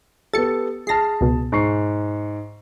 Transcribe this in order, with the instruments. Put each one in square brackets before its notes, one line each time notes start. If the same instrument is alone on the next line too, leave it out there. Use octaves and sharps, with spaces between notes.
[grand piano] B3 G4 A4 [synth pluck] A6 C#7
[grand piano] G#4 A5 [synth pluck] F6 A#6 C7
[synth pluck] C#2 B2
[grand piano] G#2 C#6 C7